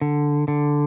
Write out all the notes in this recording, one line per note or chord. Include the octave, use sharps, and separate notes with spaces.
D3
D3